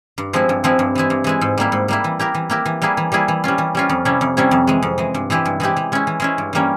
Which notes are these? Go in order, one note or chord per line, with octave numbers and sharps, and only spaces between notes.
G2
F3 G#3 C4 E4
G2
F3 G#3 C4 E4
G2
E3 G#3 E4
G2
E3 G#3 E4
G#2
G3 A#3 E4
G#2
G3 A#3 E4
E3
A#3 E4 G4 A#4
E3
A#3 E4 G4 A#4
E3
G3 A#3 E4 G#4
E3
G3 A#3 E4 G#4
E3
G3 C#4 F4
E3
G3 C#4 F4
F2
C3 G3 C#4 E4
F2
C3 G3 C#4 E4
F2
E3 G#3
F2
E3 G#3
G2
E3 G#3 E4 G4
G2
E3 G#3 E4 G4
E3
G#3 C#4 E4
E3
G#3 C#4 E4
G2
E3 G3 A#3 C#4